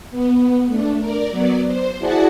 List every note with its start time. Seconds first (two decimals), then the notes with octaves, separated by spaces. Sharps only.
0.11 B3
0.67 A3 D4
1.00 A#4 D5
1.30 F#3 B3 D5
1.67 C5
1.99 E4 F#4 G#4 D5 F#5 A5